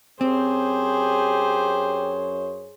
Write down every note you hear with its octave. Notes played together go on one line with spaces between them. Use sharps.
F#2 C4 G4 G#4 C5 C#5